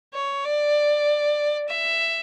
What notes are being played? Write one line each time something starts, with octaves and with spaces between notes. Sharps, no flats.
C#5
D5
E5